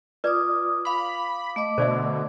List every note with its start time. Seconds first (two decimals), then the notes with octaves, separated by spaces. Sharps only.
0.24 F4 B4 D5 D6 D#6
0.85 F5 B5 D6
1.56 A3 D#5 D6
1.78 B2 D3 C5 D5 E5